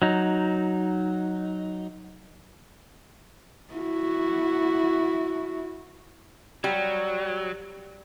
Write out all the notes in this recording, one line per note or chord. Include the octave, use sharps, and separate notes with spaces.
F#3 D#4
E4 F#4
F#3 G3